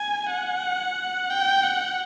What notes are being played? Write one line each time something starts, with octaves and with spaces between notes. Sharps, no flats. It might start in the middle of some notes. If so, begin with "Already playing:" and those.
Already playing: G#5
F#5
G5
F#5